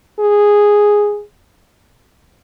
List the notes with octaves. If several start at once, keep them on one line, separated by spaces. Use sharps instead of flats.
G#4